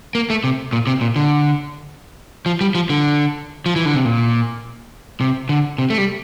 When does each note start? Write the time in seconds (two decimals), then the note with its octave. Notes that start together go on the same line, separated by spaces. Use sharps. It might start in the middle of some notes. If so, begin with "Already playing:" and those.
0.15 A#3
0.30 A3
0.44 C3
0.73 A#2
0.87 C3
1.01 A#2
1.16 D3
2.46 F3
2.61 G3
2.75 F3
2.90 D3
3.66 F3
3.76 E3
3.85 D3
3.95 C3
4.05 A#2
5.21 C3
5.49 D3
5.78 C3
5.90 A3
5.98 G3